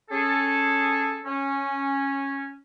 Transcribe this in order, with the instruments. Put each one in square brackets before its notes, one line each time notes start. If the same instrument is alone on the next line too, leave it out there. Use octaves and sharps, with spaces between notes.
[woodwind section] C#4 G#4 A4
C#4